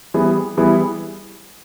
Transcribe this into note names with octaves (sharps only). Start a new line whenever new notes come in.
E3 G3 B3 E4 G#4
E3 G3 B3 E4 G#4